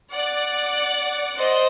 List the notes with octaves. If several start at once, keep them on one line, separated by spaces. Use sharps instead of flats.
D5 F#5
C5 D#5